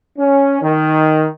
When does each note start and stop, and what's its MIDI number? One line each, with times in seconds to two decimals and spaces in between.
0.18 0.60 61
0.61 1.27 51